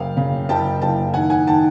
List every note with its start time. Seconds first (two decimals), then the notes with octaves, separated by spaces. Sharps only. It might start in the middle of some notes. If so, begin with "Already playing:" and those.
Already playing: F#1 F5 G5
0.17 C#3
0.49 F#1 G5 A5
0.82 F#1 G5 A5
1.14 D#3 F#5 G#5
1.30 F#5 G#5
1.47 D#3 G5 A5